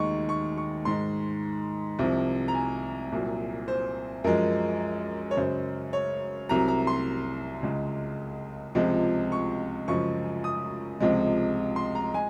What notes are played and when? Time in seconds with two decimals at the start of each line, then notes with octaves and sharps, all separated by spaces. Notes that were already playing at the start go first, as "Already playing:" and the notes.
Already playing: D#2 D#3 G#3 C#6
0.29 C#6
0.57 C#6
0.85 G#2 D#3 G#3 C6
1.99 C2 C3 F3
2.48 A#5
2.54 G#5
3.12 C2 A#2 F#3
3.68 C5
4.24 F#2 F3 G#3 A#4
5.31 C#5
5.37 F#2 C#3 G#3 C5
5.93 C#5
6.49 C2 C3 F#3 A#5
6.68 A#5
6.87 C6
7.63 C#2 C#3 G#3
8.75 C#2 C3 F3 G#3
9.32 C#6
9.88 F#2 C#3 F3 G#3 C#6
10.44 D#6
11.00 C#2 C3 F3 G#3
11.76 C6
11.95 A#5
12.14 G#3 G#5